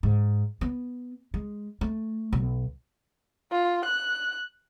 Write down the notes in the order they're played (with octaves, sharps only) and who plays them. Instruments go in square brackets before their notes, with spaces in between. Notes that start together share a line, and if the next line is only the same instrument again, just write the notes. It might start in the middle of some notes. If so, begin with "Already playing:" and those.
[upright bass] G#2
B3
G#3
A3
B1
[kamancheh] F4
F#6